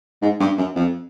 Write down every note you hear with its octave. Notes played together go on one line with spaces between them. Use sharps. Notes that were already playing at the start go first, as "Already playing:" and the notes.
G#2
G2
F#2
F2